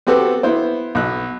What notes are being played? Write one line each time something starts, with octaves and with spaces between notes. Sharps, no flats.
B3 C4 F#4 G4 A4 B4
B3 E4 C5
B1 F#6